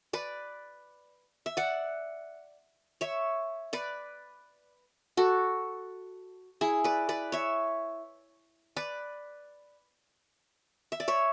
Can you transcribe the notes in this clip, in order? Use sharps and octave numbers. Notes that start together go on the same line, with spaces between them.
B4 D5
E5
D5 F#5
C#5 E5
B4 D5
F#4 A4
E4 G#4
B4 D5
B4 D5
C#5 E5
B4 D5
E5
D5
C#5 E5